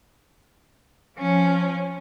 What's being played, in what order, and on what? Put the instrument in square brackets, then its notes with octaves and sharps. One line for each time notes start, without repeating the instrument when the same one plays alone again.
[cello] F3 C#4